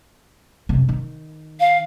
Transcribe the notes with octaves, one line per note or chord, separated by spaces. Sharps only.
F2 C3
D#3
F5